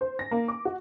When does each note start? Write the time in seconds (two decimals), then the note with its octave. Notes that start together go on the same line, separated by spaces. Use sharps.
0.01 C5
0.19 A#6
0.31 A#3
0.48 D6
0.65 F#4